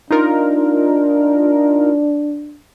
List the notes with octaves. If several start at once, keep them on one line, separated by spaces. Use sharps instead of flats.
D4 D#4 F4 A#4